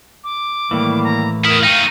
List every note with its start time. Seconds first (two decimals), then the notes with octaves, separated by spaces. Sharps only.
0.24 D6
0.71 A2 D#3 E3 G3 A#3
1.04 A#5
1.45 E2 E4 A#4 D#6 F6
1.63 A3 D#4 F5 G5 D#7